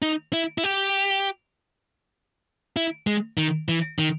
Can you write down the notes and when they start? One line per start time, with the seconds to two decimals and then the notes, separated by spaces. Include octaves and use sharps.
0.02 D#4
0.33 E4
0.58 E4
0.64 G4
2.76 E4
3.07 G#3
3.38 D#3
3.69 E3
3.99 D#3